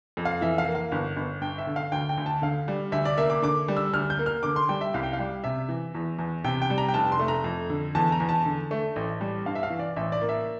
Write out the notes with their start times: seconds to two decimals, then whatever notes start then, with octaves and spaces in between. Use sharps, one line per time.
0.17 F2
0.25 F5
0.41 E3 E5
0.58 F5
0.67 A#3
0.75 F5
0.92 G1
1.16 G1
1.41 G2 G5
1.58 E5
1.67 D3
1.76 F5
1.92 D2 G5
2.09 G5
2.18 D2
2.26 A5
2.42 D3 F5
2.68 G3
2.92 D2 E5
3.05 D5
3.18 A#3 E5
3.30 D6
3.42 D3 D6
3.68 G3
3.77 E6
3.93 D2 F6
4.10 G6
4.19 A#3
4.26 F6
4.43 D3 D6
4.56 C6
4.69 G3 G5
4.81 E5
4.94 C2 F5
5.03 G5
5.13 F5
5.19 G3
5.44 C3 E5
5.69 E3
5.95 E2
6.19 E2
6.44 C3 G5
6.62 G5
6.70 G3
6.78 A#5
6.89 G5
6.94 F1 A5
7.12 C6
7.19 A3
7.28 A#5
7.44 F2
7.70 D3
7.95 E2 A5
8.12 A#5
8.20 E2
8.29 A5
8.46 D3
8.71 A3
8.96 A1
9.21 G3
9.46 G2 F5
9.55 E5
9.63 F5
9.70 E3
9.79 D5
9.96 A1 E5
10.12 D5
10.21 A#3
10.29 E5